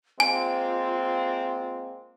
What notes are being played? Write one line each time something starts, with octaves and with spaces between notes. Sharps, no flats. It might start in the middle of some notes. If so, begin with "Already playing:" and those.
G#3 A#3 C4 F4 G#5